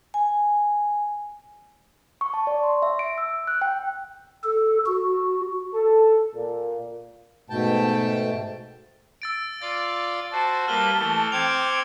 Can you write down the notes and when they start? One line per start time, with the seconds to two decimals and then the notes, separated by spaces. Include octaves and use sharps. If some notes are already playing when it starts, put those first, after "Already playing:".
0.14 G#5
2.21 C#6
2.34 A5
2.47 D5
2.64 C6
2.82 E5
2.99 D7
3.18 E6
3.47 F#6
3.61 G5
4.44 A4
4.86 F#4
5.73 A4
6.34 A#2
7.50 G#2 B2 A3 G5 A5
9.22 E6 A6 D7
9.62 F4 D5 A6
10.32 F#4 C5 A5
10.68 G3 A#3 B4 F6 G7
10.99 E3 A3
11.32 C4 G5 D6 G#6 C#7 F7